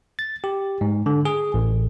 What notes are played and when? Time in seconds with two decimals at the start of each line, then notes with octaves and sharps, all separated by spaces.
0.19 A6
0.44 G4
0.81 G#2
1.06 D3
1.25 G#4
1.54 A1